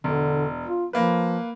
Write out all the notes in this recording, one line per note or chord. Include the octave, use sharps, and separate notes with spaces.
E1 D3
F4
F3 A#3 B4